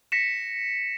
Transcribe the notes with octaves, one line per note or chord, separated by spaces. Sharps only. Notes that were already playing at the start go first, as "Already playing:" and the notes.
A#6 B6 C#7 E7